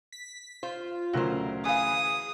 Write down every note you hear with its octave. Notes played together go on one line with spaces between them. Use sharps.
B6
F4 C5
D2 C#3 F#3 A#4 C5
E3 G#4 B4 F5 D#6